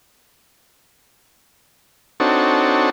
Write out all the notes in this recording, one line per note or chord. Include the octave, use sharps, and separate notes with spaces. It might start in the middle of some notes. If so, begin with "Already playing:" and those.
C4 D4 D#4 F#4 A4 C#5